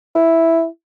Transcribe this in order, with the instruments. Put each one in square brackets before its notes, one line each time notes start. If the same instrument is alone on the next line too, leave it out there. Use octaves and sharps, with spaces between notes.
[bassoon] E4